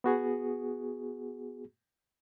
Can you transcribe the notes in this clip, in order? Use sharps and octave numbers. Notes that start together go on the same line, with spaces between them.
B3 F#4 G#4